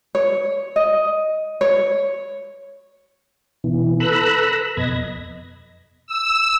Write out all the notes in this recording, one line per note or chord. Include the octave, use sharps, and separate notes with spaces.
C#5
D#5
C#5
B2 E3
A4 B4 A#5 B5 E6 F#6
F2 B2 D#5 B5 G#6 A#6
E6